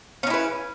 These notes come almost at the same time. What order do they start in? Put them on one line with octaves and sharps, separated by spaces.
C#4 D#4 E4 B4